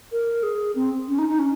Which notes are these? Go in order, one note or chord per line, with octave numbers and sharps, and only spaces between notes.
A#4
G#4
C4
C#4
D#4
D#4
C#4